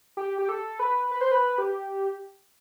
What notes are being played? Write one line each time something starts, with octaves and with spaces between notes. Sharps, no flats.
G4
G4
A4
B4
B4
C5
B4
G4